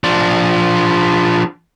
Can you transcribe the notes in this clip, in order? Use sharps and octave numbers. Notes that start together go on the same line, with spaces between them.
F3 D4